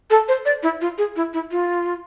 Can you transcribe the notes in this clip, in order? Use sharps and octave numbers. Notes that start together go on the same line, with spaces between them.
A4
C5
D5
E4
F4
G#4
E4
E4
F4